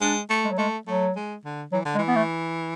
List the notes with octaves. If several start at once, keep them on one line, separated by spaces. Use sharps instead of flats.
G#3 D4
A3
G#3
F#3
G#3 A3
F#3 A3
G#3
D3
E3 F#3
D3
G#3
E3
B3
A3